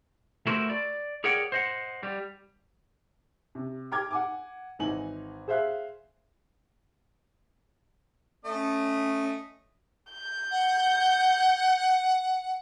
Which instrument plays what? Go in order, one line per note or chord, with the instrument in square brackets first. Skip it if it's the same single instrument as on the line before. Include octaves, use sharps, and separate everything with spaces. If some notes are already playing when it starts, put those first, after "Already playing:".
[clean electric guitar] A3 E4 F#4 A#4 C5
D5
G#4 A#4 C#5 D5 F#5 G5
C5 D#5 F#5
G3
[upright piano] C3
G5 A#5 D6 F6 G#6
F#5 G#5 D6
G#1 E3 D#4 G#5 F#7
G#4 C5 E5 F5 F#6
[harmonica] A3 D#5 [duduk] C#4
[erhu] G6
[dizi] F#5